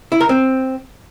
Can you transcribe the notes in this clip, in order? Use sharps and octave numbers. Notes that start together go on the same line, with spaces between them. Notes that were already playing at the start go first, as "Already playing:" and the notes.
E4
A#4
C4